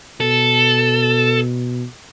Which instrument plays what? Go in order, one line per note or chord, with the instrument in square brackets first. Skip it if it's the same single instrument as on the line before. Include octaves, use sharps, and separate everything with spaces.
[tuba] B2 [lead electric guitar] A4